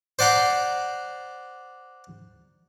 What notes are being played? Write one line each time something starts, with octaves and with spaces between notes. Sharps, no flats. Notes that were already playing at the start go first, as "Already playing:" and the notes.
C5 D5 F#5 A#5 C6